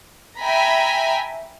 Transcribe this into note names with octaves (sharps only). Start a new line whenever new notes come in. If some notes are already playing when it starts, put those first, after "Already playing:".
E5 G5 G#5 A#5 B5